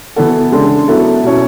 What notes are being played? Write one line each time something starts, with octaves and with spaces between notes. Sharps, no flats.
E3 B3 F#4 A4
C#3 G#3 D4 A4
F#3 B3 E4 A4
B2 F#3 C#4 E4